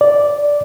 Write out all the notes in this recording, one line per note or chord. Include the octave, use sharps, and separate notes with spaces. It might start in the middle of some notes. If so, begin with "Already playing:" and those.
D5